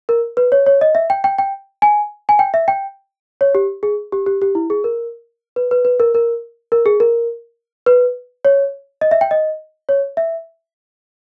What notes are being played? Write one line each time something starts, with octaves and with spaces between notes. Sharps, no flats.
A#4
B4
C#5
C#5
D#5
E5
G5
G5
G5
G#5
G#5
G5
E5
G5
C#5
G4
G#4
G4
G4
G4
E4
G#4
A#4
B4
B4
B4
A#4
A#4
A#4
G#4
A#4
B4
C#5
D#5
E5
G5
D#5
C#5
E5